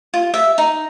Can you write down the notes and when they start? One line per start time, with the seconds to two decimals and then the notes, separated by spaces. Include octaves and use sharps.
0.14 F4
0.34 E5
0.58 D#4